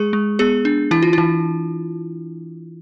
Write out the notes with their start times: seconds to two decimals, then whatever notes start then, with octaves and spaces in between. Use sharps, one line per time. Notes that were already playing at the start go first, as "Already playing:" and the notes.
Already playing: G#3 G#4
0.13 G#3
0.39 B3 G#4
0.65 D4
0.91 E3 E4
1.03 F4
1.13 E3 E4